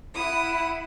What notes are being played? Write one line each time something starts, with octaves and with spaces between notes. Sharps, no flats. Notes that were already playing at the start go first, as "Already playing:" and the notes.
E4 F#5 D#6